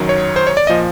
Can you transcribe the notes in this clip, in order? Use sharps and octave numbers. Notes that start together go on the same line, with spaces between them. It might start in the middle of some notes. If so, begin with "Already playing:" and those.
Already playing: F#2 D#3 F#3
C#5
C5
C#5
D5
A#2 F3 D#5